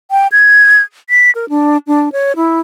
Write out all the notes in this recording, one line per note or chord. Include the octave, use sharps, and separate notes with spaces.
G5
G#6
B6
A#4
D4
D4
C#5
E4